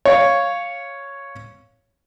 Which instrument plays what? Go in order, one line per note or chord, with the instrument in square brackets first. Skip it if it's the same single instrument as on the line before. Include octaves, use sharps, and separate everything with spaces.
[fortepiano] C#5 F5